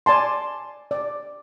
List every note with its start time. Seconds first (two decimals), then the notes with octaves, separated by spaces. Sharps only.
0.06 D5 G#5 A5 C6
0.91 D5